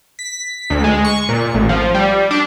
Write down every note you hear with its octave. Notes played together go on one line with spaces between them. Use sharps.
B6
D2
G#3
C#6
A#2
A1
F3
G3
D4